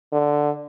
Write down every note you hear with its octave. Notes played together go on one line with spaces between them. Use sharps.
D3